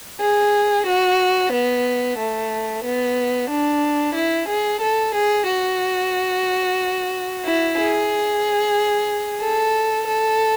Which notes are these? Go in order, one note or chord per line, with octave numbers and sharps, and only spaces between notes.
G#4
F#4
B3
A3
B3
D4
E4
G#4
A4
G#4
F#4
E4
G#4
A4
A4